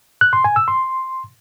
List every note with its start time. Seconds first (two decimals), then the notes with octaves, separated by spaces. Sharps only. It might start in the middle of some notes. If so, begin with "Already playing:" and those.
0.21 F#6
0.33 C6
0.44 G#5
0.56 E6
0.68 C6